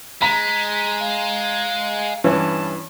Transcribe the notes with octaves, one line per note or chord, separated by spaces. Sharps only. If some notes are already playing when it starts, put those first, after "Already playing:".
G#3 A#5 B6
F5
G2 E3 C#4 A5